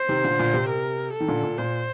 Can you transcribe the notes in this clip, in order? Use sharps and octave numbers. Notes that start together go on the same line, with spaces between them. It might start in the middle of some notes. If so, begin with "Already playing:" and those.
Already playing: C5
C3 D#3
A#2 D3
A#2 D3
C3
A#4
A4
D#3
A#2 D3
A#2
A#2 C5